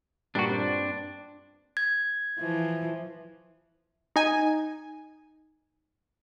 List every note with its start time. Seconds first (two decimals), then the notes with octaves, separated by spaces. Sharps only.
0.35 G2 A#2 D4 F#4 G5
0.49 C4 D4
1.77 G#6
2.39 E3 F3
4.16 D#4 G#5